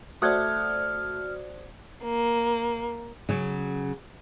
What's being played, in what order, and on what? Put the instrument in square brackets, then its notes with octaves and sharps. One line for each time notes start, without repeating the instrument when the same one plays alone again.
[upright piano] A3 [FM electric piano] F#4 C5 D5 [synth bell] D#6 F#6 G#6 [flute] F6
[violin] A#3
[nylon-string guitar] C#3 F#3